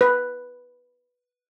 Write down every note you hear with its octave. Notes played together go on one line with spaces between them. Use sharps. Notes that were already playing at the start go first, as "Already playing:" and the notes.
B4